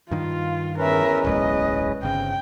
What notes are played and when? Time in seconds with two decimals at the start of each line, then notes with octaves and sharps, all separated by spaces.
0.11 G2 D#3 F4 F5
0.78 E2 C#4 A#4 B4 E5
1.25 D1 B1 G#3 D#5
2.03 G1 C#3 C4 G5